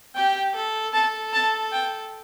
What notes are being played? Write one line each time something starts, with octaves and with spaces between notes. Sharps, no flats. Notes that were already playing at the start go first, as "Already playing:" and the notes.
G4 G5
A4
A4 A5
A5
G5